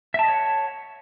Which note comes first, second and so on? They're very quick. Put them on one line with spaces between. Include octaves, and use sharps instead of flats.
E5 A5 D#5 C#5 F#5